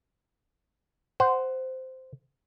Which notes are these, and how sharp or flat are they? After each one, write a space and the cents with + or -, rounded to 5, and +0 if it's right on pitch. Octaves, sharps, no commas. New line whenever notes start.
C5 -10 F#5 +10